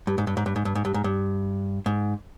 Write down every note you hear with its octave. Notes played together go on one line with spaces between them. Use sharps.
G2
G#2
G2
G#2
G2
G#2
G2
G#2
G2
G#2
G2
G#2